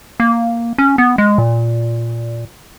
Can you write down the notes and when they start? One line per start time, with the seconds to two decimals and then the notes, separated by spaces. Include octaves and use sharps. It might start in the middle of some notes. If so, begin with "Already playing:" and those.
0.20 A#3
0.78 C#4
0.98 B3
1.18 G#3
1.38 A#2